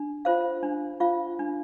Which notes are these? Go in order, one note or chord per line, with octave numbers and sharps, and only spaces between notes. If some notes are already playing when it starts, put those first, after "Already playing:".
Already playing: D4
F4 C5 F5
D4
F4 C5 F5
D4